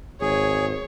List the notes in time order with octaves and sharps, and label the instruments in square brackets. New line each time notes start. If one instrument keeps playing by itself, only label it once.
[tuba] G#1 [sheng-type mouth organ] G#4 [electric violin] C#5